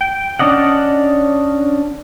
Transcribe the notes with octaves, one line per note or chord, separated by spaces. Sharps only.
G5
C#4 D4 D5 D#5 F#5